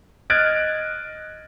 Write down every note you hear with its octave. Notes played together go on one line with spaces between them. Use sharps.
D#5 F6 F#6 G#6 A6 D7